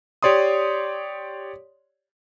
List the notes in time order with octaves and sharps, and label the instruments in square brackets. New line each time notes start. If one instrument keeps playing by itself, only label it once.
[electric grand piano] G4 C#5 D5 C6 D#6